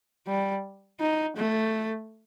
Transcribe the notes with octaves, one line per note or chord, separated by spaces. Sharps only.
G3
D#4
A3